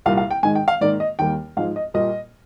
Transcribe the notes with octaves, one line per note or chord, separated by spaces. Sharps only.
C2 A#2 G3 A#3 F5
F5
G5
G#2 D#3 G#3 G#5
G5
F5
G#2 D#3 A#3 D5
D#5
D#2 D#3 G3 A#3 G5
G#2 F3 G#3 F5
D#5
A#2 G3 A#3 D#5